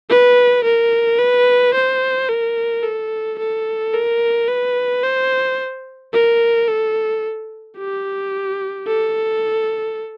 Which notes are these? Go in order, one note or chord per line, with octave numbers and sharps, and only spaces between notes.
B4
A#4
B4
C5
A#4
A4
A4
A#4
B4
C5
A#4
A4
G4
A4